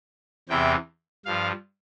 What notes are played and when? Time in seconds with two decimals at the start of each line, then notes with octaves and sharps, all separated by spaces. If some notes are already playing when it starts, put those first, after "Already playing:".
0.49 E2 C3 E3 G5
1.25 G2 F3 F5